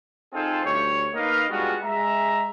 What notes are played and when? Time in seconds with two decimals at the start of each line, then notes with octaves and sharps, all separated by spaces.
0.33 C4 D#4 F4 G#4 A4 C5
0.64 D2 G3 C#5
1.14 A#3 D#4 A#4 B4 D#5 F5
1.49 G3 G#3 B3 D4 F4 F#4
1.82 G#3 E5 A#5